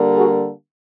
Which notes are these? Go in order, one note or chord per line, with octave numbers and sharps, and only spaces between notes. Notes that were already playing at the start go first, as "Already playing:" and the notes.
Already playing: D3 G3 A#3
F#4 G#4